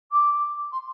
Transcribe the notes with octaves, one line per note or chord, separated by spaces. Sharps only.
D6
C6